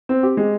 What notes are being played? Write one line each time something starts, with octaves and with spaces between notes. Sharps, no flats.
C4
G4
G#3